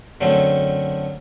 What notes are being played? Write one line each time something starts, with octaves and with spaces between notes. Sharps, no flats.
F#2 D3 F#3 A3 C4